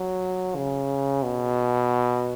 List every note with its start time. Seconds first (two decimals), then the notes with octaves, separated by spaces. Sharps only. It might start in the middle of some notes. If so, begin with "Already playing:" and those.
Already playing: F#3
0.56 C#3
1.23 B2